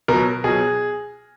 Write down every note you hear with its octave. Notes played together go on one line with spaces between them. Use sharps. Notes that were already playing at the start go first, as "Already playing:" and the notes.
B2 F#3 A#4
B2 F#3 G#4